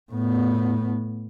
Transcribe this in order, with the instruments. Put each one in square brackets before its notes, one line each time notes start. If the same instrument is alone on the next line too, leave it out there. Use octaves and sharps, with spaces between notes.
[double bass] A2 B3